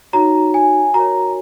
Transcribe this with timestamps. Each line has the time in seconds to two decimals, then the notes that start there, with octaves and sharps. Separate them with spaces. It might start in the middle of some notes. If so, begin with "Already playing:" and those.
0.13 D#4 F#4 C#5 A#5
0.54 G#5
0.94 F#4 A#4 C#5 A#5